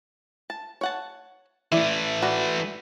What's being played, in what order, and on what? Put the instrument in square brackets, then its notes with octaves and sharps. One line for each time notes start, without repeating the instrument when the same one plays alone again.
[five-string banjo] A5
C#5 F#5 A5
[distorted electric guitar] E3 A3 [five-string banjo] E4 D5
[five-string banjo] F#4 B4 D5